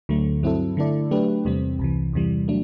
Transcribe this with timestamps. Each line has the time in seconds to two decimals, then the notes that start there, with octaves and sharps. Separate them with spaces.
0.09 D2 D3 F#3 A3
0.43 G2 F#3 C4 E4 A4
0.77 D3 A3 E4 A4 D5
1.11 F#3 A3 D4 G4 B4
1.45 E2 C3 G3 C4
1.79 C2 C3 E3
2.13 E2 C3 E3 G3
2.48 F#3 A3 D4